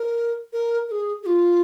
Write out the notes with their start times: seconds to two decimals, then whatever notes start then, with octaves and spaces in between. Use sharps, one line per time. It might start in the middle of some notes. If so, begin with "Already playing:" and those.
Already playing: A#4
0.53 A#4
0.88 A#4
0.92 G#4
1.23 G#4
1.26 F4